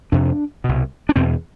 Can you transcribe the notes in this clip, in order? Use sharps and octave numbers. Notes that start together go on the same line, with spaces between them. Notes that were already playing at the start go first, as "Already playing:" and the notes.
F2 C3 D4
C2 B2
D4
E2 B2 C4